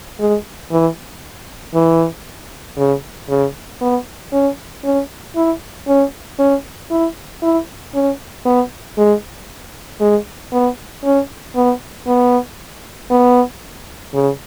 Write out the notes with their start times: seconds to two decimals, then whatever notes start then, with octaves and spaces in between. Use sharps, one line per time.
0.20 G#3
0.71 E3
1.74 E3
2.78 C#3
3.29 C#3
3.81 B3
4.32 C#4
4.84 C#4
5.36 E4
5.88 C#4
6.39 C#4
6.90 E4
7.42 E4
7.94 C#4
8.45 B3
8.98 G#3
10.01 G#3
10.52 B3
11.04 C#4
11.56 B3
12.07 B3
13.10 B3
14.14 C#3